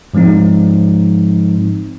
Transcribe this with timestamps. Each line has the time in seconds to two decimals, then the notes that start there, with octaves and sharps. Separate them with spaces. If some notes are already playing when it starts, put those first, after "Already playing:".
0.14 G#2 F3 G#3 C4 D#4